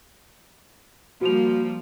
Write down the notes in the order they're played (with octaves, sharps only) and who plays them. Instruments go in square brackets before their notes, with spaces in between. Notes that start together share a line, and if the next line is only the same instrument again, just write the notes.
[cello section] F3 G3 A#3 [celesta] F#4 F7